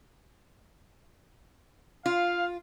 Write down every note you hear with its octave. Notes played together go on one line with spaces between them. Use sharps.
F4 F5